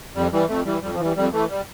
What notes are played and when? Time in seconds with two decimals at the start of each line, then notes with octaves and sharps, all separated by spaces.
0.15 F2 G3
0.32 E3 G3
0.49 F2 A3
0.65 E3 G3
0.82 F2 G3
0.93 F3
1.00 E3
1.05 G3
1.16 F2 G3
1.33 E3 A3
1.50 G3